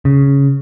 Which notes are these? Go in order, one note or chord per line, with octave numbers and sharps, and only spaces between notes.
C#3